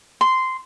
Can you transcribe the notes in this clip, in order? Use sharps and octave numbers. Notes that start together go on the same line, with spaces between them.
C6